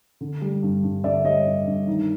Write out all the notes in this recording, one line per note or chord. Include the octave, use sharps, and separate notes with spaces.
D3
G3
G2
G2
D3 D5 E5
G3 C#5 D#5
G2
G2
D#3